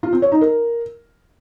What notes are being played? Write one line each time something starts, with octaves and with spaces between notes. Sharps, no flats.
F4
C4
C#5
D#4
A#4